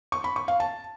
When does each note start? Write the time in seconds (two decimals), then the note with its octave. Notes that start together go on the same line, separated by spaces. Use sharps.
0.12 C#6
0.24 B5
0.36 C#6
0.48 F5
0.60 A5